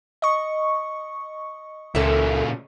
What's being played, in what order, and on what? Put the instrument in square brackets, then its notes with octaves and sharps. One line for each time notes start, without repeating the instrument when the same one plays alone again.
[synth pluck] D#5 C#6
[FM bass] C#2 [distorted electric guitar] A#2 C#3 [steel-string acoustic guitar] A4 A#4 E5